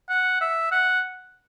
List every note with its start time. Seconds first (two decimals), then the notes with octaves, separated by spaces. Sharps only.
0.09 F#5
0.41 E5
0.72 F#5